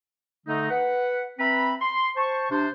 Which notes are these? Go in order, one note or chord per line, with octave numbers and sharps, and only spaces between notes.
D3 A3 D#4
B4 F#5
C4 B4 E5 A#5 B5
C6
C5 A5 C#6
C3 D4 C5